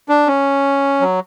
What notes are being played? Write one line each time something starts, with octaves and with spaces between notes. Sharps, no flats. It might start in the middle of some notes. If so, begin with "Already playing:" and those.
D4
C#4
F#3